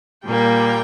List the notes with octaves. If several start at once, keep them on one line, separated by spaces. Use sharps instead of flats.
A#2 G3 A#3 G5